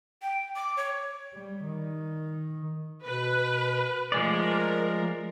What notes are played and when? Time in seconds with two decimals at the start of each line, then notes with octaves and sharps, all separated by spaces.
0.22 G5
0.56 D6
0.77 C#5
1.34 G3
1.65 D#3
3.06 B2 B4
4.12 F3 G#3 A3 A#4 D5